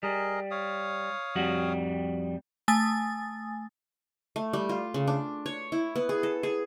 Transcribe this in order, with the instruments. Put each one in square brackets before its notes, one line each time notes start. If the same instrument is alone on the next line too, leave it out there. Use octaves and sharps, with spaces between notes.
[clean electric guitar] G3 [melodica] G#4 A#4 D#5
[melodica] C#5 F5 D#6
[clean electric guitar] F2 G3 F#4
[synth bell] A3 G#5 D#6 A6
[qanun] A3
G3
F4
C#3
D4
C#5
E4
B3
G#4
A4
G#4